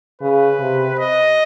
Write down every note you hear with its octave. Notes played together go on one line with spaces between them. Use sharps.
C#3 B4
C3
D#5